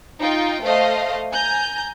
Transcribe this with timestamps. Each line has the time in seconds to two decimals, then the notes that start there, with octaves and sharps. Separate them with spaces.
0.19 D#4 F4 G5
0.63 A3 C5 D#5 F5
1.32 G#5 A#5 G6